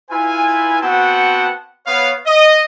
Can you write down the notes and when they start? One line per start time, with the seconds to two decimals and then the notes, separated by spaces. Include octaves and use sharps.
0.11 E4 F4 B4 G#5
0.82 B3 C4 F#4 F#5 G5 A5
1.87 B3 C#5 F5
2.26 D#5